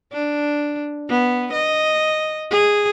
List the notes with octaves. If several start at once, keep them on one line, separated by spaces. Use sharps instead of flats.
D4
B3
D#5
G#4